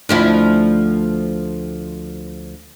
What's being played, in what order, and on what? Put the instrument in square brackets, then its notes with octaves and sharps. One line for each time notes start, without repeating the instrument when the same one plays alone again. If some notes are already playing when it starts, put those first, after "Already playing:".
[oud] D2 F3 E4